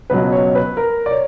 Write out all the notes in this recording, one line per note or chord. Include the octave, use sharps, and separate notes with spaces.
C#2 B2 F#3 B4
C#5
B4
A#4
D5
C#5